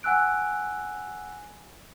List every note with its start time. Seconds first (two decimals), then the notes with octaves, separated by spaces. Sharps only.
0.03 F#5 G#5 E6 F#6 D7